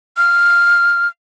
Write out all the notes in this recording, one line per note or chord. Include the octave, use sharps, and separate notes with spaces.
F6